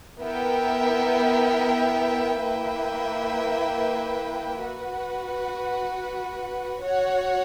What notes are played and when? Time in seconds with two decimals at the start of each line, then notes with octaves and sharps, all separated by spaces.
0.21 B3 E4 A#4 E5 G5
2.41 A#3 E4 B4 E5 G5
4.62 F#4 B4 F#5
6.82 F#4 C#5 F#5